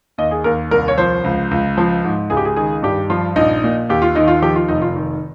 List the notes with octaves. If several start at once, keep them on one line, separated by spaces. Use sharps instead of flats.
D#2 D#5
G#4
D#2 A#4
C2 A#4
C#5
F3 C5
C#2
C#2
F3
G#2
C#2 G#4
G4
G#4
D#3 G#4
G2 G4
F3 F4
A#1 D#4
A#2
D#2 G4
F4
D#3 D#4
F4
F3 G4
F4
F1 D#4
F4
D#3